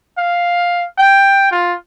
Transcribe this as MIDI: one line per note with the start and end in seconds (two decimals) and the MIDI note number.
0.18 0.85 77
0.98 1.47 79
1.51 1.75 65